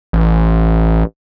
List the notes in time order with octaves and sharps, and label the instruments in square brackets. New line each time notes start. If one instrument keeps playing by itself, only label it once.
[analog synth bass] A1